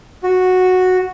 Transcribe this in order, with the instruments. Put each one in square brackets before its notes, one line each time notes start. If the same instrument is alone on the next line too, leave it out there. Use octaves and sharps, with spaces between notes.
[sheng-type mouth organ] F#4